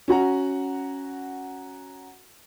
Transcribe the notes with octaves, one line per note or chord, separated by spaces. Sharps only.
C#4 F#4 F#5 A#5